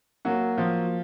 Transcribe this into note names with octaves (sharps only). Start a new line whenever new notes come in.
F#3 A#3 F#4
F3